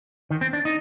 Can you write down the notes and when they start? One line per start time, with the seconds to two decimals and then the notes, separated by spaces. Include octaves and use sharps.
0.30 D#3
0.41 C4
0.53 D4
0.65 D#4